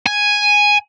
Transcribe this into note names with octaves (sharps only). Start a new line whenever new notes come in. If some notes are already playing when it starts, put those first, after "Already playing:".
G#5